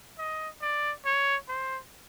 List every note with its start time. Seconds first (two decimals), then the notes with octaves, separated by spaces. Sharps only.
0.18 D#5
0.62 D5
1.06 C#5
1.49 C5